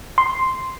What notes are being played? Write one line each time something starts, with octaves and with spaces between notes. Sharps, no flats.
C6